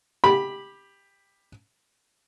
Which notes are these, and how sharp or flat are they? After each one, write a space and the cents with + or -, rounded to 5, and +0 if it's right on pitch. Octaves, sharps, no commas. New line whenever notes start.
G4 +15 B5 -10